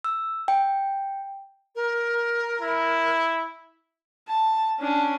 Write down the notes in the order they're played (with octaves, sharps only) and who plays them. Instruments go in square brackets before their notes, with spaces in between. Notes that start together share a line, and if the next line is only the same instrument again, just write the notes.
[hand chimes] E6
G5
[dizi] A#4
[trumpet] E4
[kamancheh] A5
C#4 D4